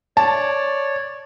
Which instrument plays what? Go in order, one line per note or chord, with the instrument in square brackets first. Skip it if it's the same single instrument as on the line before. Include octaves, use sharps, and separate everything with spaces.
[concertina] C#5 D5 [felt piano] A5